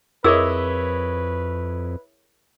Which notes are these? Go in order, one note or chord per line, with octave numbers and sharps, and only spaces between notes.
F2 E4 G#4 A#4 B4 C#5 D#5 E6